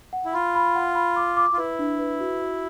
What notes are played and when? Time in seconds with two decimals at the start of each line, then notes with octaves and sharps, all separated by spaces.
0.13 F#5
0.25 E4
0.33 F4 B5
0.55 B5
0.75 F#5
0.95 B5
1.16 D6
1.37 D6
1.53 F4
1.58 E4 B4
1.79 D4
1.99 B4
2.20 F#4
2.41 F#4